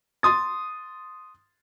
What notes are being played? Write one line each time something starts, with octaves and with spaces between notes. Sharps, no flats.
C6 D#6 A6